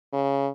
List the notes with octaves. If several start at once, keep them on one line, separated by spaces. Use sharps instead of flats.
C#3